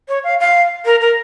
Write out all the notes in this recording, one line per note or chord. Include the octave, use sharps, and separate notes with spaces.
C#5
F5
F5
A#4
A#4